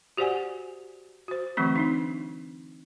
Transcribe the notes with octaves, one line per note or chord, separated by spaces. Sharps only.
F#4 G4 C5 D5 F#5 G#5
F#4 C5
D3 E3 F#3 A3 C4 C#6
C4 D4 D#4